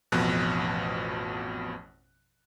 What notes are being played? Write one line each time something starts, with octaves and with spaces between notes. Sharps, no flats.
A1 F2 B2 F3 F#6